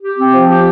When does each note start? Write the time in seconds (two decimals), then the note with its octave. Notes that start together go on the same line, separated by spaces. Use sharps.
0.02 G4
0.17 C4
0.33 F3
0.49 G4